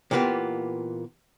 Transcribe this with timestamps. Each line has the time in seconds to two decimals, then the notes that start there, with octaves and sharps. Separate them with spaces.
0.11 A#2 E3 A#3 B3 F4 G4